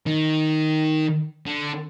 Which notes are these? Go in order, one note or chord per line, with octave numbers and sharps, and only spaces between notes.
D#3
D3